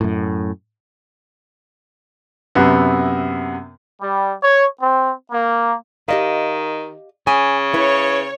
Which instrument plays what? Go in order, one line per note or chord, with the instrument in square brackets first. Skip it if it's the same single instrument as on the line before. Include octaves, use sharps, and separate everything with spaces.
[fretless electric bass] F#2 A2
[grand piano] F#2 C3 B3
[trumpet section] G3
C#5
C4
A#3
[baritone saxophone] D#3 [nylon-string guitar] G4 D#5 F5
[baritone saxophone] C#3 [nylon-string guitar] G#5
[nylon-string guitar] E4 B4 [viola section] C#5